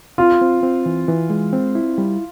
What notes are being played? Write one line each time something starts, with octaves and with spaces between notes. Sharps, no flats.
C4 F4
C4
C4
E3
E3
G#3
C4
E4
G3